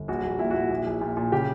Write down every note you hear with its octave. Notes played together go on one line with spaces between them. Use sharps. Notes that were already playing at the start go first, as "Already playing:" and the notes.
Already playing: G1
A#1 F#4
A#1
A#2 E4
F#4
A#2 E4
A#1
A#1
A#2
A#2
C#3 G4